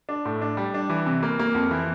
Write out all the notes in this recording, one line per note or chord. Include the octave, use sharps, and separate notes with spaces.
D4
A2
D4
G3
D4
E3
C3
A#3
A#3
F2
E3